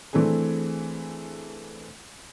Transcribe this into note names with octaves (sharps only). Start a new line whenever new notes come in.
E3 A3 C4 D4 G#4